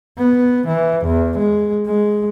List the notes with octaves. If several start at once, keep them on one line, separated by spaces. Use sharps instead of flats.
B3
E3
E2
G#3
G#3